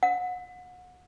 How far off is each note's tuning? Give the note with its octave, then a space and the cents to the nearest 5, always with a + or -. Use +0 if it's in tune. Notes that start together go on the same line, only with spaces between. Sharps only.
F#5 -30